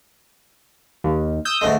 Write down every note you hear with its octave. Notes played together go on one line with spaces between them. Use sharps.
D#2
D#6 E6 G6
D2 A2 G#3